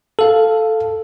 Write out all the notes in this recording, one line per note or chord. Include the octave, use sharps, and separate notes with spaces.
A4 F5